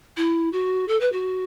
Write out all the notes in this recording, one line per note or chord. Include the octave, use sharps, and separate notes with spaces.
E4
F#4
A4
B4
F#4